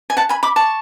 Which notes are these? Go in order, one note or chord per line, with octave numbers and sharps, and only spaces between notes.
G#5
F#5 A5
G#5 B5
B5 D6
A5 C#6